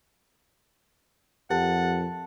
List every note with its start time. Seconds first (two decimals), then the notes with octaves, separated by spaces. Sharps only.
1.50 F2 G4 A#4 F#5 A5